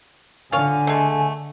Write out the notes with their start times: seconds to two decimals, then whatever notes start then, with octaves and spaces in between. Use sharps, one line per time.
0.52 D3 F4 C#5 F5 G#5
0.87 G#3 A3